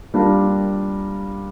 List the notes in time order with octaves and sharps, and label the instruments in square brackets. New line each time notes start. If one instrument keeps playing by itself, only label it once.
[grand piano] G3 A#3 D4 F4 A#4